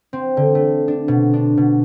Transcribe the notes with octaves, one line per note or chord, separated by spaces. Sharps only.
C4
D3
A3
D4
B2
D4
B2